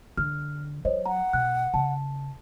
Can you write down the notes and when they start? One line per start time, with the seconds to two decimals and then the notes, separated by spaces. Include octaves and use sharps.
0.17 D3 F6
0.85 F#3 C5 C#5 D#5
1.06 F#5 A#5
1.33 B2 F#6
1.74 C#3 A5